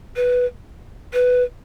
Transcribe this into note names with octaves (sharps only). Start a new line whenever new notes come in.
B4
B4